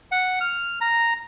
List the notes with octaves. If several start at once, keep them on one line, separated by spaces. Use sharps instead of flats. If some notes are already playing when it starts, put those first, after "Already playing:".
F#5
F6
A#5